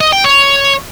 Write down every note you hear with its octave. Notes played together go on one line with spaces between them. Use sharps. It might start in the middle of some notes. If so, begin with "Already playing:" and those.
D#5
G5
C#5